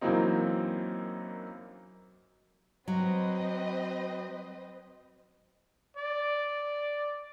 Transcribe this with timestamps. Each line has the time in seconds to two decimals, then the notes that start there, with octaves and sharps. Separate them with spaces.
0.01 F#2 E3 F#3 A#3 C4 D#4
2.88 F#3 C4 B4 D#5
5.97 D5